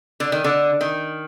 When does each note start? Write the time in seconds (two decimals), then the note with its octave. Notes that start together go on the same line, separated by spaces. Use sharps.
0.20 D3
0.32 D#3
0.44 D3
0.81 D#3